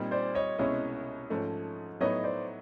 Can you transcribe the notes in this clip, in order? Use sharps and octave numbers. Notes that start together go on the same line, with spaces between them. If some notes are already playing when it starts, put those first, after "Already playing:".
Already playing: A#2 G3 C4 D#4
C5 D5
C#5 D#5
C2 B2 G#3 C#4 E4 C#5 D#5
G#2 F3 A3 C#4
A2 F#3 B3 D#4 C#5 D#5
C5 D5